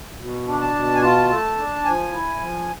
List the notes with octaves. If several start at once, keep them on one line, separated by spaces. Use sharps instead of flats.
B2
D4
A5
B2
G#5
F4 A5
A3
D4
F3 G#5
E4
F3